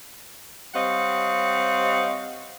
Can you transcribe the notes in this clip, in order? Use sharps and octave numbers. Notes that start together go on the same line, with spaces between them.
G3 C4 C#5 D#5 F5 F#5